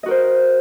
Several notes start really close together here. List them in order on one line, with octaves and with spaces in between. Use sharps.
D#5 F#4 A#4 C5